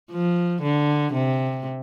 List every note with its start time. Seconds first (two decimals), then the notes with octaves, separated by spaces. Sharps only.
0.12 F3
0.63 D3
1.13 C3